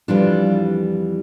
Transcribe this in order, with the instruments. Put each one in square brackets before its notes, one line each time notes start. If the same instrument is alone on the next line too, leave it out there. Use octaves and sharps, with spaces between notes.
[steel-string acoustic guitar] F2 E3 G3 D4 F4